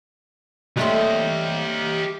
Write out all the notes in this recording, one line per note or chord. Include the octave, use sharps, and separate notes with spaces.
G3 A3 C4 G4 D#5